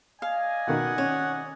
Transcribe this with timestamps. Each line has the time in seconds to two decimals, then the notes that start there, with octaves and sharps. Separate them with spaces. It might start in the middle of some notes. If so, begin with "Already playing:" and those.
0.22 D5 D#5 F5 G#5
0.67 B2 D#3 F#5
0.98 C#4 C#5